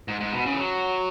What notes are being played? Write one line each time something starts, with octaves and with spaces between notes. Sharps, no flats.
G#2
G#2
B2
C#3
E3
F#3